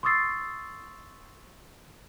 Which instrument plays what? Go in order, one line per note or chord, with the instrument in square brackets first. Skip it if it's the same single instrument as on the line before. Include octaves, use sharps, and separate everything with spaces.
[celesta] C6 C#6 D#6 E6 A6 C7